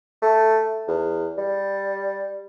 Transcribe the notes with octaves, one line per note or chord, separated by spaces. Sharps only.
A3
E2
G3